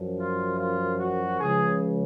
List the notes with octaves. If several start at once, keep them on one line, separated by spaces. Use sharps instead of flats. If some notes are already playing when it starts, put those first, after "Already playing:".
Already playing: F#2 F3
F4
F4
F#4
C#2 C#3 F3 G#4